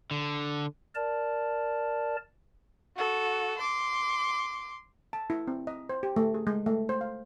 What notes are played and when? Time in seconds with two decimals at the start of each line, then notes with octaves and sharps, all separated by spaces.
0.11 D3
0.95 A#4 D5 A5
2.97 F#4 A4
3.58 C6 D6
5.13 A5
5.30 E4
5.48 C4
5.67 D#5
5.89 C5
6.03 G4
6.16 A3
6.34 G#4
6.47 G#3
6.66 A3
6.89 C5
7.01 F5